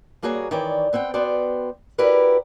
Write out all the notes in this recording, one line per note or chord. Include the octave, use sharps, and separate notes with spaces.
G3 A#3 F#4 G#4 C#5 A#5
D#3 E3 C#5 D5 G5
B3 C4 F#5 G5
B3 F#4 C5 D5 G5
E4 F#4 G4 A#4 B4 D5